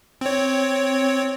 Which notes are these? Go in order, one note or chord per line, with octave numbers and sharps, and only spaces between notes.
C4 C#5